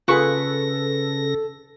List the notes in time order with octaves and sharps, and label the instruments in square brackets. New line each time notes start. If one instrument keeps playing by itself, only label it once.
[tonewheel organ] C#3 A#6 [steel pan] F4 G#4 [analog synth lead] A4 [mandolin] B4 C#6